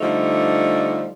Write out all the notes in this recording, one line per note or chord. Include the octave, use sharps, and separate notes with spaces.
D3 F3 G3 A3 D#4